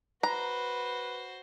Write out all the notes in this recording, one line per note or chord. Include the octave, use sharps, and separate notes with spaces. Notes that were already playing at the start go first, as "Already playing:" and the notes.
F#4 B4 C5 A#5